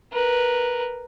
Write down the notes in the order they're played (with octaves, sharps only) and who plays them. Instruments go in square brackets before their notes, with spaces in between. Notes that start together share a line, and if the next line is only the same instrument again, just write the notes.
[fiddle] A#4 B4